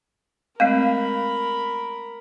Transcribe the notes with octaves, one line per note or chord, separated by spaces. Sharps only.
G#3 A3 C4 A#4 F5 B5